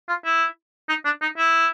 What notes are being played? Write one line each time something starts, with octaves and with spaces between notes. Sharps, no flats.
F4
E4
D#4
D4
D#4
E4